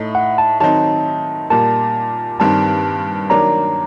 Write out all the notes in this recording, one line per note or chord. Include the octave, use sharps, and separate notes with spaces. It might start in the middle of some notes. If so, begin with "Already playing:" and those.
Already playing: A2 A3 D#4
F#5
A5
D#3 F#3 C4 D#4 A5
A#2 G3 A#3 A5
G2 D#3 G3 C4 A5
D#3 F#3 A#3 D4 A#5